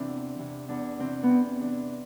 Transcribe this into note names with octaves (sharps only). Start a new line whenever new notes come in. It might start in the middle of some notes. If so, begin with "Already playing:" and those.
Already playing: C3 E3 C4 D4 E4
E2
C3 E3
E2 D4
C3 E3 C4
B3
E2 C4
C3 E3 D4